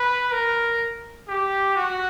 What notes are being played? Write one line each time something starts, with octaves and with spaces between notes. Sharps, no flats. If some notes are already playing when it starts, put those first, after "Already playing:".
Already playing: B4
A#4
G4
F#4